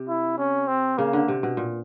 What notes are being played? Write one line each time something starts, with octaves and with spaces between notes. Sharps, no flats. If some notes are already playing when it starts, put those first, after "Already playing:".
Already playing: C3
E4
C#4
C4
C#3 A#3
D3
C3
B2
A#2